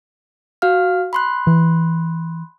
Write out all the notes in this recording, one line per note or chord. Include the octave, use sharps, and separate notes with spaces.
F#4 F5 F6
B5 C6 F#6
E3